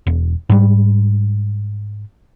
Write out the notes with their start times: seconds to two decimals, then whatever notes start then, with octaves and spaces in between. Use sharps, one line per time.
0.07 E1
0.50 G#2 G3